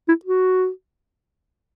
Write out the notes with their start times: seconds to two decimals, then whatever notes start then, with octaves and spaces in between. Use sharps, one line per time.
0.08 E4
0.25 F#4